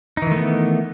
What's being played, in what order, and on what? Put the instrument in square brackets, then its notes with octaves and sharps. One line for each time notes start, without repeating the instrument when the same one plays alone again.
[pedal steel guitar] D#4
E3
D#3
A3
B3